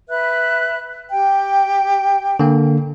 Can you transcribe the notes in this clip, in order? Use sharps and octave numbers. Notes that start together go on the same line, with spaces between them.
B4 E5 F#6
G4 G5
D3 A#3